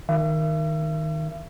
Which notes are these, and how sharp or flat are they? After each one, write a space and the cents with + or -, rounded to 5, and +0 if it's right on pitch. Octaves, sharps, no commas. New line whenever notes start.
D#3 +0 E5 +40